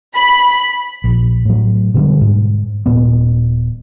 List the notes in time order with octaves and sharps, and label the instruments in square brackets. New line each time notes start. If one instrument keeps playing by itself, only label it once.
[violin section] B5
[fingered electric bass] A#1
A2 F#3
B2 D3 G3
G#2
D#1 A#2 B3